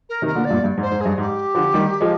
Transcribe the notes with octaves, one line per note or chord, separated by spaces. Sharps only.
A#4
C3 D#3
A#4
A#2 D3
D5
G2 A#2
G2
G#2
C5
G#2
G2 G#4
G#2 G4
D3 F3
D#3 G3
F3 G#3